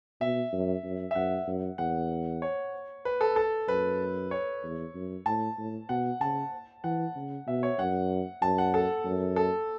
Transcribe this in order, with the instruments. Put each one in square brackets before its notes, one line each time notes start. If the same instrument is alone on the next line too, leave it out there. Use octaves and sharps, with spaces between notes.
[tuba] B2 [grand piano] E5
[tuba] F#2
F#2
[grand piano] E5
[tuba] F#2 [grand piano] F#5
[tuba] F#2
[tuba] E2 [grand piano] F#5
[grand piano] C#5
B4
A4
A4
[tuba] F#2 [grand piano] B4
[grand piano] C#5
[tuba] E2
F#2
[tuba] A2 [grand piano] A5
[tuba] A2
[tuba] B2 [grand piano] F#5
[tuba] C#3 [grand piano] A5
[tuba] E3 [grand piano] F#5
[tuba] C#3
[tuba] B2 [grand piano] E5
[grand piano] C#5
[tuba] F#2 [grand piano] F#5
[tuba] F#2 [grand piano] A5
[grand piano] F#5
A4
[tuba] F#2
[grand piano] A4